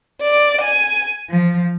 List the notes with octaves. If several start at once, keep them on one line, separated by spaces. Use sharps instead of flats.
D5
G#5
F3